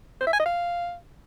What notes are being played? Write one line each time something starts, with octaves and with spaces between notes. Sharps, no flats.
C5
E5
G#5
D#5
F5